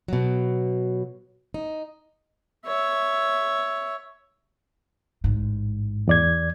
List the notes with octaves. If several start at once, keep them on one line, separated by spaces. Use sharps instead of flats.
B2 F#3
D#4
C#5 E5
A1 G#2
E2 D5 G#6